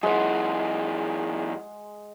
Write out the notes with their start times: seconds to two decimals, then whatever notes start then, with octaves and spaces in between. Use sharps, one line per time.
0.03 F#2 E3 G#3 F#5